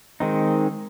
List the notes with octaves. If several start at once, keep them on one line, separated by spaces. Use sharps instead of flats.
D#3 G#3 C4 D#4